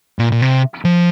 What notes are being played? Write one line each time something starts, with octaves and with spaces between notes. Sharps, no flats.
A#2
A#2
C3
F3